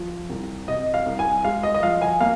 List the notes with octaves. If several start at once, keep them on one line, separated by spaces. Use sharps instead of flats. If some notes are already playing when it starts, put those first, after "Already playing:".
Already playing: F3
C2
C3 D#5
F5
C2
G#5
G#3 F5
D#5
D#5
F3 F5
G#5
A#3 F5